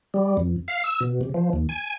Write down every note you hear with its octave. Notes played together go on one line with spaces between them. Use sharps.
G3
F2
F5
E6
B2
C3
F3
D#2
G#5